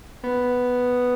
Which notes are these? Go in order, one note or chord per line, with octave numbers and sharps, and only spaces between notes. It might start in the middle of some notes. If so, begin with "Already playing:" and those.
B3